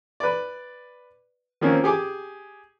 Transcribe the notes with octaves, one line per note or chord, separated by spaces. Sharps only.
B4 D5
D#3 F3 A#3 C4 C#4
G4 G#4 D6